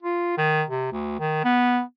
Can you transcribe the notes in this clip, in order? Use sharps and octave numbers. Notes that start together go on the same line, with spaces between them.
F4
D#3
C3
D2
D#3
B3